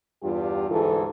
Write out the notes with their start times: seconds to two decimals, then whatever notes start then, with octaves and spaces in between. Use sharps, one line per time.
0.23 E2 G2 F4 G4
0.70 D2 G#2 E3 G#4 A4